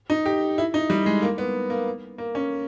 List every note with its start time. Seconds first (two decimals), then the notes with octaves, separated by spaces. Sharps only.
0.10 D#4
0.26 G4
0.58 E4
0.74 D#4
0.90 G3
1.06 G#3
1.22 A#3
1.38 B3
1.70 A#3
2.18 A#3
2.35 C#4